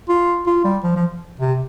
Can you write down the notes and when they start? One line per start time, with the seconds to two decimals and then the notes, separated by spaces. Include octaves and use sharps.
0.09 F4
0.47 F4
0.64 G3
0.84 F3
0.96 F3
1.40 C3